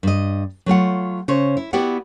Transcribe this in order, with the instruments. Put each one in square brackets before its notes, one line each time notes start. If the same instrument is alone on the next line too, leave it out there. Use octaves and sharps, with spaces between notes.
[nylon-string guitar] G2 D#5
F#3 A3 F4 F#5
C#3 C5 C#5
E4
B3 E4 F#4 G4 D5 F#5